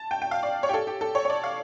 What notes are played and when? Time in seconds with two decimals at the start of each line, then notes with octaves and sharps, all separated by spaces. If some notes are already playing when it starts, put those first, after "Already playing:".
Already playing: A5
0.11 G5
0.22 G5
0.31 F5
0.43 D5
0.63 C#5
0.69 G4
0.74 A4
0.87 G4
1.01 A4
1.15 C#5
1.25 C#5
1.30 D5
1.44 F5